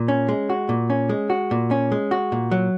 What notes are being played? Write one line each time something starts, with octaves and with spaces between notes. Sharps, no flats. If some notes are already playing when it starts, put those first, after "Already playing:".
Already playing: A#2
C#4
G#3
F#4
A#2
C#4
G#3
F#4
A#2
C#4
G#3
F#4
A#2
F#3